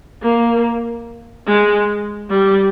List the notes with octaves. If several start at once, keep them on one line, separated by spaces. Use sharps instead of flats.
A#3
G#3
G3